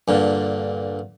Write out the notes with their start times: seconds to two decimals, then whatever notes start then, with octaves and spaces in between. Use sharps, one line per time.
0.08 G2 A#2 D3